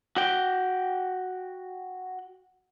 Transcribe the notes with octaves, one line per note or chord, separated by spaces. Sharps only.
F#4 G5